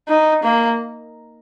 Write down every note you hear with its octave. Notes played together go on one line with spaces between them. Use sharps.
D#4
A#3